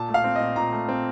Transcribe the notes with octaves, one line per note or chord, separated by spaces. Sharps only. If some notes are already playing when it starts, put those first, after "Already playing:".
Already playing: A#2 A5
A3
F5
C4
A#2 D#5
A#2 A#5
A3
C4